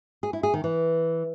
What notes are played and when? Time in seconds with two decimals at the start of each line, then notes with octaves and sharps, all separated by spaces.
0.23 G#4
0.33 E4
0.43 G#4
0.54 D#3
0.64 E3